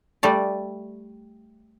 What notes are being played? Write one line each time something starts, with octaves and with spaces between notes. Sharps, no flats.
G3 A3 D5